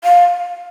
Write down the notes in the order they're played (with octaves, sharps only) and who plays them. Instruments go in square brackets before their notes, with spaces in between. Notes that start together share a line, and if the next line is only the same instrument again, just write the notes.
[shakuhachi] F5